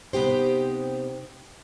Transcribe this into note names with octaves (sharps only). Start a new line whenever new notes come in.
C3 B3 D#4 G4 C5